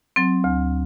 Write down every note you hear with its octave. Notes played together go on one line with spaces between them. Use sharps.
F#3 C4
D2